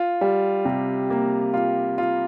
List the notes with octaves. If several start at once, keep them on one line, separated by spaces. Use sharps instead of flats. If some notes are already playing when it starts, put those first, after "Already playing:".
Already playing: F4
G3
C3
A#3
F4
F4